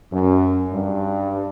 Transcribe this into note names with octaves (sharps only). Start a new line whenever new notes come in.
F#2
G2